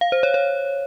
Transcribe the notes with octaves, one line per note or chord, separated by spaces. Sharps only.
F5
C5
C#5
C#5